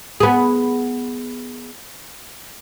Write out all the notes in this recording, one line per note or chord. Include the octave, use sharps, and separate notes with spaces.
B3 G#4